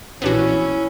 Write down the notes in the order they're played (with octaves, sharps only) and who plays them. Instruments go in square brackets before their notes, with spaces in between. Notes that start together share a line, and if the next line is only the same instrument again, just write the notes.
[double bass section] A#1 E3 [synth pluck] B3 D4 F#4 [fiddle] C#4 [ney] E4